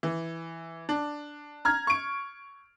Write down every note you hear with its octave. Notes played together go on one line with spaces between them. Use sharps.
E3
D4
A#5 F6 G#6
C#6 D7